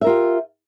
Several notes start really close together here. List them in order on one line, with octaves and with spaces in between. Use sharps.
E5 A#4 F4 G4